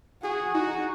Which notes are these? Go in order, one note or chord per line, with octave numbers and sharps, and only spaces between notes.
F#4 G#4
D#4 F#4